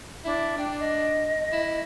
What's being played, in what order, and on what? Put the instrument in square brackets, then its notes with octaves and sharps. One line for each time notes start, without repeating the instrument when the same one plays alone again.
[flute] D4 [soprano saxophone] E4
[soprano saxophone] D4 [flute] G5
[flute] D#5
[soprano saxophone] E4